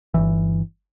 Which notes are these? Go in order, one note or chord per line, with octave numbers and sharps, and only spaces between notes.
G1 C2 E3